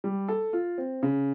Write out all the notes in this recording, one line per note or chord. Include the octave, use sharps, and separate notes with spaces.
G3
A4
F4
C4
C#3